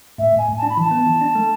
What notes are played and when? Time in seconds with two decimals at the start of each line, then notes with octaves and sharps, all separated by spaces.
0.18 A2 E5
0.33 A2 G#5
0.48 A2
0.57 A5
0.63 D4
0.69 B5
0.77 E3 A5
0.91 B3
1.06 E3
1.21 D4
1.35 A3